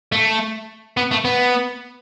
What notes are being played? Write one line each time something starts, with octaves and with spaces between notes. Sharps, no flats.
A3
B3
A3
B3